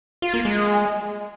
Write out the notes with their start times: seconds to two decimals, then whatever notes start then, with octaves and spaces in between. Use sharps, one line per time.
0.22 F4
0.34 A#3
0.45 G#3